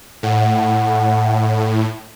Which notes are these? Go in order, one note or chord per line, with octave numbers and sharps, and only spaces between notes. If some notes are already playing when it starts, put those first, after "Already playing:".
A2 F#5